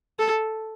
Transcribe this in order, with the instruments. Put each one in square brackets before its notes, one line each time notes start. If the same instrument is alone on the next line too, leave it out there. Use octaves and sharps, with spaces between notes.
[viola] A4